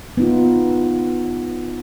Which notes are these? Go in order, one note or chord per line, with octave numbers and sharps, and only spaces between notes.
B3 D#4 F4